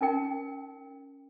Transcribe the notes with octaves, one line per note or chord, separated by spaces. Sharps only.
C#4 D#4 A#4 G5